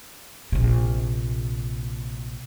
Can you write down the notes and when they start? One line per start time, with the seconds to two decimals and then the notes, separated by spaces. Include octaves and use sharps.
0.52 A#1 C3